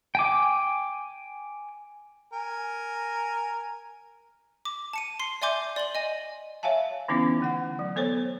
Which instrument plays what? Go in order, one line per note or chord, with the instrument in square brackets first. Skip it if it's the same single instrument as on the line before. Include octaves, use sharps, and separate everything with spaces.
[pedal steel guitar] G5 G#5 D6
[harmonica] A#4 G#5
[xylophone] D6
A5 C#7 D#7
C6 C7
D5 E5 G#5 C6 D6 G6
D5 C6 F#7 G7
D#5 G#5
[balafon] C#5 E5 F5 G#5 A5
D3 E3 B3 C#4 D#4 E4
D3 A3 F#5
F#3
B3 A4 C5 C#5